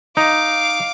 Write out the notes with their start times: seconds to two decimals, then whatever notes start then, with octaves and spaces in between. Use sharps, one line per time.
0.17 D#4 F5 D6